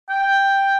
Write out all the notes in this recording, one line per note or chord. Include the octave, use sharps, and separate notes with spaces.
G5